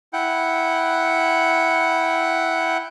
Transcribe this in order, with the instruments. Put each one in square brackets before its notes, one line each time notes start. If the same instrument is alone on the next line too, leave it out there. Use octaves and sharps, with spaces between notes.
[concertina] E4 F#5 G5